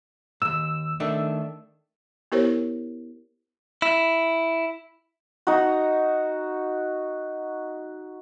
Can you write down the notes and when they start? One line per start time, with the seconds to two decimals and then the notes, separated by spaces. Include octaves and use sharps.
0.42 D#2 G#2 E6
1.00 D#3 A3 D4
2.32 B3 E4 G4 A#4 C5 C#5
3.82 E4
5.47 D#4 F#4